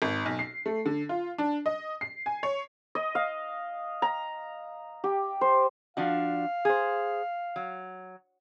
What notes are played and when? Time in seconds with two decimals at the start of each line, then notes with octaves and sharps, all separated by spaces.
0.02 G#1
0.26 B1
0.39 C7
0.66 A3
0.86 D3
1.09 F4
1.38 D4
1.66 D#5
2.01 C7
2.26 G#5
2.43 C#5
2.95 D#5
3.15 F5
4.02 A#5
5.04 G4
5.41 C5
5.97 F3 D4 F#4 F5
6.65 G#4 C5
7.56 F#3